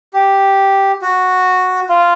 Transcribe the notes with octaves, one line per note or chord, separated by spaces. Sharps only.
G4
F#4
F4